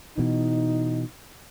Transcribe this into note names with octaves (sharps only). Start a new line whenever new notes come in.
B2 E3 D#4